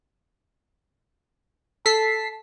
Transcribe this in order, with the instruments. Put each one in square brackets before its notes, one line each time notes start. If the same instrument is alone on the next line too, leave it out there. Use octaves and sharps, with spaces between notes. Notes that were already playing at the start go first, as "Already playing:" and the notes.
[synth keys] A4 B6 C7 [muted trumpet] A5